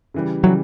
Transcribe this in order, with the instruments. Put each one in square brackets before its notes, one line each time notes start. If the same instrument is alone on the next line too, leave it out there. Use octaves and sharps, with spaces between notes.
[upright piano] C#3 E3 G3
[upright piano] C#3 E3 G3 [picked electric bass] F#3